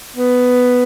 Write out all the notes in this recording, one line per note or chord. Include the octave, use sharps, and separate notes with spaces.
B3